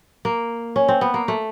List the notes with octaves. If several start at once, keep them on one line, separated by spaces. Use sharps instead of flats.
A#3
C#4
C4
B3
A#3
A3